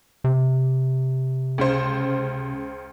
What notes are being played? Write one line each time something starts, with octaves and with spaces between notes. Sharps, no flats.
C3
C#2 C#3 C5